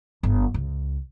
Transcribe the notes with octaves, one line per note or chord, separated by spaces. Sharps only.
G1
C#2